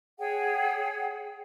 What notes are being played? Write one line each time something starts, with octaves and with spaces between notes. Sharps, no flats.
G#4 C#5 F#5 G5